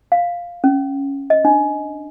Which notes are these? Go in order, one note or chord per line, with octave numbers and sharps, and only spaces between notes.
F5
C#4
D#5
D4